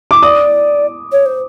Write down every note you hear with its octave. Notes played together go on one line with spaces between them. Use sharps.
D6
D5 D#6
C#5
C5